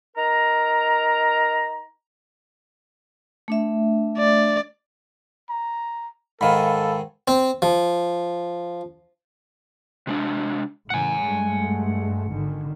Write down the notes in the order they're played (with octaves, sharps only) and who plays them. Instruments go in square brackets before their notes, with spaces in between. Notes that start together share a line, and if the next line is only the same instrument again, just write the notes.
[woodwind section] D#4 A#4 A#5
[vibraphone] A3 D4 E5
[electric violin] D5
[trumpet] A#5
[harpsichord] G#2 D#3 [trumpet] A4 [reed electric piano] F5 B5
[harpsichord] C4
F3
[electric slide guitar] C3 G#3 D4
[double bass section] A2 C#3 E3 [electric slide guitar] F#5 G#5
[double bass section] G2 G#3 A3
G#1 D3 D#3